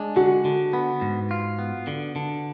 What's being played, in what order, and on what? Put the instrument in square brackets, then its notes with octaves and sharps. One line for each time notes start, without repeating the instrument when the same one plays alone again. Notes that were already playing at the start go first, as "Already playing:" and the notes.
Already playing: [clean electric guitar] G#3 D4
[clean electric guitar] D3 [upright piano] F#4
[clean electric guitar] D3
B3
G#2
F4
B3
D3
D3